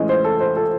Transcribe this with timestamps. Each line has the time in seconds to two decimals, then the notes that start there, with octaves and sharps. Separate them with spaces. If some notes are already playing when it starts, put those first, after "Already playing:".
Already playing: A2 E3 G#3 C#4 D#5
0.09 C5
0.24 A4
0.41 C5
0.56 A4